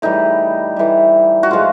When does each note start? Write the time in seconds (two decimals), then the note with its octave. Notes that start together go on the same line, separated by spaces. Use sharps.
0.02 A2 E3 G3 D#4
0.76 A2 E3 G3
1.43 F#4
1.50 A2 F3 G#3 F4